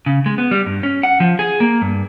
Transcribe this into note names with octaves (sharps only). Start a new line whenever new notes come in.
C#3
G#3
B3
G3
G2
C#4
F#5
F3
G#4
A#3
G2